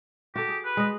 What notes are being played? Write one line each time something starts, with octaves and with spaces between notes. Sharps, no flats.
F#4 G4 A4
G#4
B4
G#3 D#5